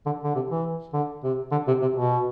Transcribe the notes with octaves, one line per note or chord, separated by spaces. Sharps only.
D3
D3
C3
E3
D3
C3
D3
C3
C3
B2